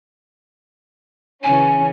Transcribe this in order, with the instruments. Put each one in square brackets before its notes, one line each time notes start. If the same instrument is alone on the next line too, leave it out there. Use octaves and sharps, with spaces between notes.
[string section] C#3 E3 C#4 [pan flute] G#5